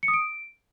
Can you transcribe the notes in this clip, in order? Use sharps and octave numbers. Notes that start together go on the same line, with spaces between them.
C#7
D#6
D7